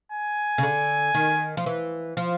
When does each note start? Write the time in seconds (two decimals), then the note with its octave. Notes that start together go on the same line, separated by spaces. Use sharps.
0.12 G#5
0.58 C#3
0.63 D3
1.14 D#3
1.57 F3
1.66 E3
2.17 F3